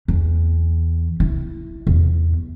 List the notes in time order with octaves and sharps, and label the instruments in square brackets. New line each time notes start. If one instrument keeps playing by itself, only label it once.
[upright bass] E2
E4
E2